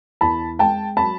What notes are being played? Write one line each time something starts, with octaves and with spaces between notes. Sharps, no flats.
E2 A5 B5
G#3 G5 A5
F#3 A5 B5